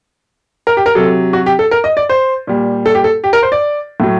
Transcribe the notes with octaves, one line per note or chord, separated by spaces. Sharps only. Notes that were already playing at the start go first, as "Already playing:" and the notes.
A#4
G4
A#4
C3 F#3 A4
F#4
G4
A4
A#4
D#5
D5
C5
A#2 G3
A4
G4
A4
G4
A#4
C5
D5
A2 F#3